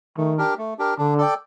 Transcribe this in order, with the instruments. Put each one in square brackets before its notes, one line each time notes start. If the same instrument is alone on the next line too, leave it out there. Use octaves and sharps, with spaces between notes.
[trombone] D#3 [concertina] A3
[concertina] D4 G4 A#4
A3
D4 G4 A#4
[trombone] D3 [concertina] D4
[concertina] A4 D5 G5